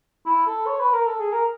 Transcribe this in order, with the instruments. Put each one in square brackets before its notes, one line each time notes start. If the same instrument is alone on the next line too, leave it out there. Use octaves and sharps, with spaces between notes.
[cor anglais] E4
A4
C#5
B4
A#4
A4
G#4
A#4